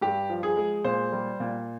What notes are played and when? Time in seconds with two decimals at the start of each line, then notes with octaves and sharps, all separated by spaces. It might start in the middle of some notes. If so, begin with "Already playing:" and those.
0.01 G2 G4
0.30 F3
0.43 G#4
0.57 G#3
0.84 A#2 C5
1.12 G3
1.40 A#2